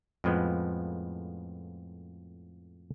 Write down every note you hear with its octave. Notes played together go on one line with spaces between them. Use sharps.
F2 A2 F3 G#3 B3